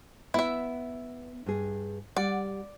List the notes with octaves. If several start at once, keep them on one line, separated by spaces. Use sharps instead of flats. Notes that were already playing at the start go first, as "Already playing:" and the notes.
B3 E4 E5
G2 G#4
G3 D5 F#5